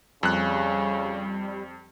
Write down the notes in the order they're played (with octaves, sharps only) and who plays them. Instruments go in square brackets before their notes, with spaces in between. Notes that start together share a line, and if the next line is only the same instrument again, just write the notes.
[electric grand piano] F2 F#6 [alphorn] C#3 [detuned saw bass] G3